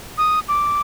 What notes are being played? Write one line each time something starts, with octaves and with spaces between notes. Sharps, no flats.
D#6
D6